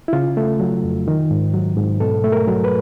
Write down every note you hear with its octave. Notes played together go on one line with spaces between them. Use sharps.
E4
C#3 F4
A3
F#3
F2
D#3
G#2
F#3
G#2
B2 A4
A3
A#4
F#3
B4